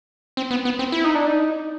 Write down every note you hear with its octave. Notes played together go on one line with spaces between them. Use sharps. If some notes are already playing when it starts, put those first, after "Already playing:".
C4
B3
B3
C4
E4
D#4
D4
D#4